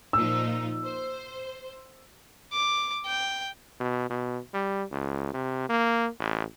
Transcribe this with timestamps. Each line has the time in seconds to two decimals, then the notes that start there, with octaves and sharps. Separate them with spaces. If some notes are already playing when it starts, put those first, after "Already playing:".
0.13 A#2 F3 D#4 E6
0.84 C5
2.53 D6
3.06 G5
3.80 B2
4.10 B2
4.54 G3
4.91 C#2
5.34 C3
5.70 A#3
6.20 A1